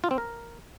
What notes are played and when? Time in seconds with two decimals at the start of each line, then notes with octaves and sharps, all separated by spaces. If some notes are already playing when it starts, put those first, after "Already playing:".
0.04 F4
0.11 C4
0.18 A#4